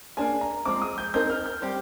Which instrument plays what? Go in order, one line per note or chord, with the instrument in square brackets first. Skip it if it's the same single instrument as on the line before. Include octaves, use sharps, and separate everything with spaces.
[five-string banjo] A#3 D4 G#4 [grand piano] G#5
[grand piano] A#5
[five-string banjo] F3 G#3 C4 [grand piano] D6
[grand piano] D#6
G6
[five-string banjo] C4 D#4 A#4 [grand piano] G6
[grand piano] F6
G6
[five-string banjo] G3 C4 G4